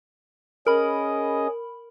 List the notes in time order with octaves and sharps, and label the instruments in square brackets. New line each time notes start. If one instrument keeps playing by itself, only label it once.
[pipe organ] C#4 G#4 D#5 [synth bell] A#4 B5